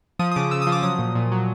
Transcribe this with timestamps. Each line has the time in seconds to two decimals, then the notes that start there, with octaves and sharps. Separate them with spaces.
0.19 F3 D#6
0.31 D#6
0.36 C#3 D6
0.51 C#3 E6
0.62 D#6
0.67 F3
0.72 D6
0.83 F#3 D#6
0.99 A#2
1.15 A#2
1.32 F#3